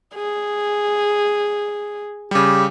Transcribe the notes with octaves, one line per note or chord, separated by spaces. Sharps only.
G#4
C#3 G3 G4